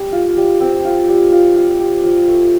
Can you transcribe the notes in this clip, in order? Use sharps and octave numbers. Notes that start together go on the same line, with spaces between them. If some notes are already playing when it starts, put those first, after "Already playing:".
Already playing: G3
F4
G3
C4
F4
G3
F4
F4
G4
F3
A3